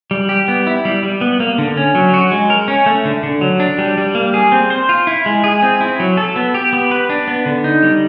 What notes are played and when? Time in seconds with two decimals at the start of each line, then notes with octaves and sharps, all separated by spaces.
0.11 G3
0.29 G4
0.48 B3
0.67 E4
0.85 G3
1.03 G3
1.21 B3
1.40 A#3
1.58 D3
1.77 C#4
1.95 F#3
2.14 F#4
2.32 G#3
2.50 A#4
2.68 C#4
2.86 A3
3.05 D3
3.23 D3
3.41 F#3
3.60 D4
3.78 G3
3.98 G3
4.15 A#3
4.34 G#4
4.52 C4
4.70 C5
4.89 F4
5.07 E4
5.26 G#3
5.44 G#4
5.62 C4
5.81 E4
6.00 F#3
6.17 A4
6.36 B3
6.54 G4
6.73 B3
6.91 B4
7.10 D4
7.28 B3
7.46 D3
7.64 D#4
7.82 G3